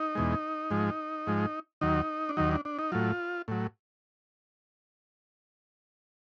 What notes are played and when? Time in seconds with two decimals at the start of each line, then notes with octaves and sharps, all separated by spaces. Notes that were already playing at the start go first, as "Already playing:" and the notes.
Already playing: D#4
0.15 E2 B2 G#3
0.71 G#2 F3 G#3
1.27 G#2 F3 G#3
1.81 D#2 D#3 F#3 D#4
2.29 D4
2.37 D#2 D#3 F#3 D#4
2.51 D4
2.65 D4
2.79 D#4
2.92 A2 F#3 F4
3.48 A2 F#3